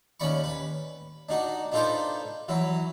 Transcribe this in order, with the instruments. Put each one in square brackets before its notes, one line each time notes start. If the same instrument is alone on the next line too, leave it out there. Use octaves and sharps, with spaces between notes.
[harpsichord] D#2 C#4 D5 B5 C#6
B4
D4 D#4 F#4
D4 D#4 F4 A4 B4 C5
E3 F#3 E4